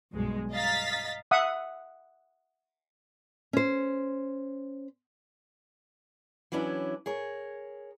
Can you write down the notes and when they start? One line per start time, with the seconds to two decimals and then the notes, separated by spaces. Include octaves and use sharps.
0.11 B1 G2 B2 G#3
0.52 D#5 F5 A#5 A6 B6
1.31 E5 F#5 D#6
3.53 C#4 C5
6.52 E3 F#3 C#4 D4 E4
7.06 G#4 A#4 C#5